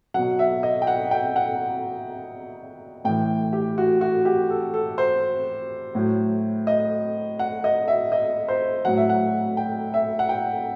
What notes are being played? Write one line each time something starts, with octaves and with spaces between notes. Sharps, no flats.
B2 F#3 F#5
E5
D#5
G5
F#5
G5
F#5
A2 E3 G5
G4
F#4
F#4
G4
A4
A4
C5
A2 F#3
D#5
F#5
D#5
E5
D#5
C5
A2 F#3 F#5
E5
F#5
G5
E5
F#5
G5